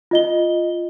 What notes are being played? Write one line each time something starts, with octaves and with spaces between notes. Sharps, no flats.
F4 D#5 G7